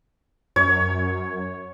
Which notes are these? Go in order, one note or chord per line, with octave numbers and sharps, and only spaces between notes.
F#2 C#5